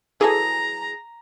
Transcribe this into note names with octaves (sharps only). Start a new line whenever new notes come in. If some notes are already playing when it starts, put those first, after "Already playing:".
E3 F#3 G#4 A4 A#5